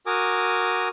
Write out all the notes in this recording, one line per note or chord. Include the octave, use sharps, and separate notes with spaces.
F#4 A#4 G#5 D6 D#6